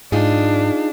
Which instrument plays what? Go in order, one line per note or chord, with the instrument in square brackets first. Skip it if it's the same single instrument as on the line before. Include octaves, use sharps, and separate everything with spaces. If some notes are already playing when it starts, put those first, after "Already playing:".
[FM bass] G#2 [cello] D4 [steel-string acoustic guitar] D#4 F4 G#4